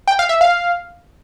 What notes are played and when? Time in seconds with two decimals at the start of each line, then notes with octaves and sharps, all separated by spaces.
0.08 G5
0.19 F5
0.29 E5
0.41 F5